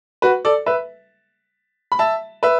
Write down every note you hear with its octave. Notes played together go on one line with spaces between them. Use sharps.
F#4 B4
A4 D5
B4 E5
B5
E5 A5
B4 E5